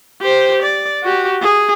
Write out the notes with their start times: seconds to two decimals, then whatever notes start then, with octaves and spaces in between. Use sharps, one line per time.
0.22 G4 C5
0.63 D5
1.03 F#4 G4
1.42 G#4